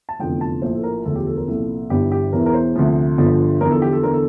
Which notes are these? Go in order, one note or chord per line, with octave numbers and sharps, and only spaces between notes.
A5
F1 E2 D3 F3 G5
A5
A#1 A2 F3 C5
A4
A#4
E1 D2 D3 F3 A4
G4
A4
A#4
C2 A#2 F3 A4
G1 G2 E3 G4
G4
E1 E2 E3 A#4
A#4
C5
D2 C3 F3
G1 G2 D3 F3
E2 D3 F3 A#4
A4
G4
A4
E2 D3 A#4
A4